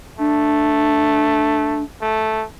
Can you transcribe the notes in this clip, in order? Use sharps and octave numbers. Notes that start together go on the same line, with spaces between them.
A3 D4
A3